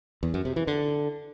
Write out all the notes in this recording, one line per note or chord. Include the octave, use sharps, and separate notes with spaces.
E2
F#2
C3
E3
D3